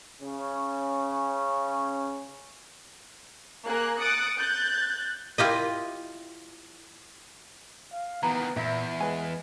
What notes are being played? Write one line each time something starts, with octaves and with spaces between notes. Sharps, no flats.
C#3 C#4
A#3 G#4 A#4 F#6
D#6 F#6 A6 C#7 D7
F#6 G6 A6
E4 F4 G4 D#5
F5
D#3 E3 B3 A#5
E2 A#2 E5
G#3 B4 G#5